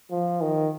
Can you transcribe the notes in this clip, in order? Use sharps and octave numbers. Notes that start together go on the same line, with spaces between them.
F3
D#3